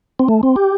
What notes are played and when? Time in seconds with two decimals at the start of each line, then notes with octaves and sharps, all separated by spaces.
0.19 C4
0.28 A3
0.43 C4
0.56 G4